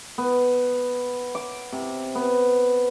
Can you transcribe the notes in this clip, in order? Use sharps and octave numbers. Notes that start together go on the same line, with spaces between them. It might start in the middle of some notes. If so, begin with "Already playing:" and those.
B3
D6
C3
B3